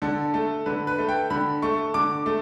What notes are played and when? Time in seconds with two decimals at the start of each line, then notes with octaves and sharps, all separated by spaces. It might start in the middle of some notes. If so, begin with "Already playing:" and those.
0.02 D3 A4
0.34 A3
0.66 D3 B4
0.87 B4
0.98 A3
1.09 G5
1.30 D3 B5
1.62 A3 C#6
1.94 D3 D6
2.26 A3